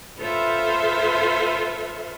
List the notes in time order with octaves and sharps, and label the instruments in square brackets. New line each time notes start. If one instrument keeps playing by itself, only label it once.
[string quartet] F4 A4 B4 C5 E5 F5